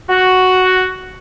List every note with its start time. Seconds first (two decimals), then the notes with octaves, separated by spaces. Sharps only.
0.08 F#4